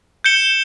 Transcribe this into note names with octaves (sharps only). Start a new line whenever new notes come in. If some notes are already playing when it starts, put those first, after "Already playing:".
G6 C#7 E7 G7